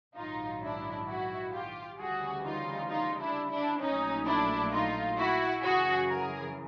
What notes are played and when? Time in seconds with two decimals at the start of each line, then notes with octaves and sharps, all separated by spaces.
0.16 A#1 G#2 D#3 F#3 D#4 F4
0.62 D4 E4
1.07 E4 F#4
1.53 F4 G4
1.98 D2 C#3 E3 G3 F#4 G#4
2.44 D#4 F4
2.89 D#4 F4
3.20 D4 E4
3.50 D4 E4
3.80 A#1 A#2 F#3 A3 C#4 D#4
4.26 D4 E4
4.72 D#4 F4
5.17 E4 F#4
5.62 F#2 C#3 E3 F#4 G#4
6.08 G#4 A#4